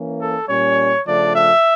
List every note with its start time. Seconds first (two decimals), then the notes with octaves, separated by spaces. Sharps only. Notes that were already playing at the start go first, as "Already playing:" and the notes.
Already playing: E3 A#3 C#4
0.19 A4
0.48 A#2 G3 C#4 C#5
1.05 C#3 F3 A3 D4 D5
1.34 E5